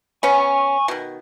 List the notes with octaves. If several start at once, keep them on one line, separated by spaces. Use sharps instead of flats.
B3 C#4 G#5 C#6
B2 D#3